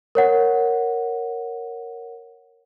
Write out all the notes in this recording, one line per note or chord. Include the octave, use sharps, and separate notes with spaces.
A#4 C#5 F#5